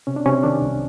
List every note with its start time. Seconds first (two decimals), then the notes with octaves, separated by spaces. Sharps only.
0.07 C3 C#4
0.16 D4
0.26 C3 C#4
0.43 D#3 D4
0.62 C2